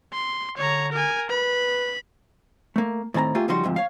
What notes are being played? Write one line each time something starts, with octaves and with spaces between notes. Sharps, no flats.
C6
D3 C#5 A#5
A#4 G#5
B4 B5
A3 A#3
A2 D#3 C4 A5 A#5
A3 A#3 F4 G4 G#4
C#3 F3 G3 D#4 F#4 C6
D2 G#2 C3 F3
C#5 F5